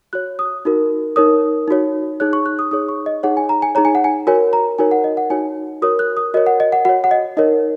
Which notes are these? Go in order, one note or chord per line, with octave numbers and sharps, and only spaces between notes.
F#4 C#5 F#6
D#6
D#4 F#4 A#4
D#4 A#4 C#5 D#6
D#4 F#4 C#5
D#4 G#4 C#5 F#6
C#6
F#6
D#6
D#4 G#4 C#5 D#6
C#6
D#5
D#4 G#4 C#5 F#5
G#5
A#5
G#5
D#4 G#4 C#5 A#5
G#5
F#5
G#5
F#4 A#4 C#5 G#5
A#5
D#4 F#4 A#4 C#5 G#5
F#5
D#5
F#5
D#4 F#4 C#5 G#5
F#4 A#4 C#5 D#6
F#6
D#6
F#4 A#4 C#5 D#5
F#5
D#5
F#5
F#4 C#5 F#5
F#5
D#5
D#4 A#4 C#5 D#5